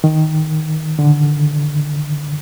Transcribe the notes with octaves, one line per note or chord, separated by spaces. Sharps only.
D#3
D3